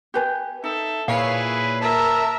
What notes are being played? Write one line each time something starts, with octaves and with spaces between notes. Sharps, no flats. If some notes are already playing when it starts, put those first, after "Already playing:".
G4 B4 G#5
D#4 A4 E5
A#2 E4 G#4 B4 C#5 F5 C7
A#4 E5 A5